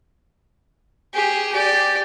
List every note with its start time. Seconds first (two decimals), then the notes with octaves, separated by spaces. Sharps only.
1.14 G4 G#4
1.52 G4 D5